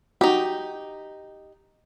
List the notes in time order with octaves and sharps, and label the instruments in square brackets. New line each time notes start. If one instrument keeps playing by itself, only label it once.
[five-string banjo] D#4 G4 [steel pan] F#4